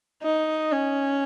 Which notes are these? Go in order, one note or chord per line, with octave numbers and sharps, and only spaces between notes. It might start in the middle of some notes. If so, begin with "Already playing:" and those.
D#4
C#4